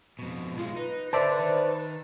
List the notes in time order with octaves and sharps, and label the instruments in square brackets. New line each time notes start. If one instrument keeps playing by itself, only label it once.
[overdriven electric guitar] F2 B2
[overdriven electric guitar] B1 G#3 [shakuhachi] F4
[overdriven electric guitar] D#4 [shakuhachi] B4
[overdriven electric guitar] D3 [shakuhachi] B4 [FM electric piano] C5 D5 E5 [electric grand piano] A5
[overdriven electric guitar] D#3